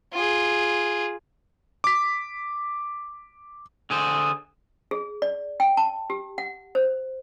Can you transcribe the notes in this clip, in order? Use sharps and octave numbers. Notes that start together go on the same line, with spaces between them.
F4 G#4
D6 B6
D3 G#4 C5
G#4
D5
G5
A5
G4
F#5
C5